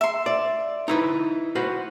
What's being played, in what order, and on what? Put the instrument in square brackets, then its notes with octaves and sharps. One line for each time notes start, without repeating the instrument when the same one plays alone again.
[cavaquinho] E5 C6
[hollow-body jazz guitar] D5
D#4 E4 B4
F#4 B4 C5